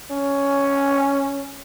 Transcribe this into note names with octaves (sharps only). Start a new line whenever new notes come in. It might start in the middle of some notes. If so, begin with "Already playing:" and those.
C#4